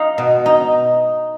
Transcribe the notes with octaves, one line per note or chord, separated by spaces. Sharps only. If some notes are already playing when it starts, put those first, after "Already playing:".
Already playing: D#4 F5
B2
D#4